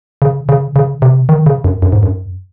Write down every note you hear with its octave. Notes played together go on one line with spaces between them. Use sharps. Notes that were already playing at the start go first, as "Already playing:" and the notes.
C#3
C#3
C#3
C3
D#3
C#3
F#2
F#2
G#2
F#2